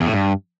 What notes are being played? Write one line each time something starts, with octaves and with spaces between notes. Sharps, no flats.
E2
A2
G2